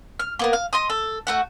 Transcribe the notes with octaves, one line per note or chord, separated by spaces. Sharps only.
F6
A#3 B3 A#4
F5
D#5 C6 D#6
A4
A3 F#4 F#5